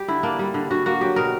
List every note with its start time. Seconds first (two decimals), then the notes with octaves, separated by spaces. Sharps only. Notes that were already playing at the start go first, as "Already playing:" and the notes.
Already playing: G3 G4
0.08 D3 E4
0.23 A#3 D4
0.39 G3
0.54 D3
0.70 D3 F#4
0.86 A#3 F#4
1.01 F#3 G4
1.16 B2 A#4